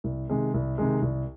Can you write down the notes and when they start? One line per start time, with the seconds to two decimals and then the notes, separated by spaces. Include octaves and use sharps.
0.04 C2
0.30 C3 D#3 G#3
0.54 C2
0.78 C3 D#3 G#3
1.02 C2